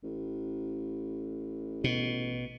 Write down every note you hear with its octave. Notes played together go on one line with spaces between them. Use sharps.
A1
B2